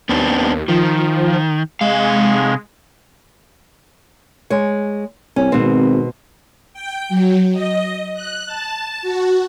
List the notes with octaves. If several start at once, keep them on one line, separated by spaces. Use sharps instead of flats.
D#2 B3 C4 D4
D#3 F3
C3 G#3 F5
G#3 C#5
C2 C#4
G#1 B2 C4
G5
F#3
D#5
F#6
A5
F#4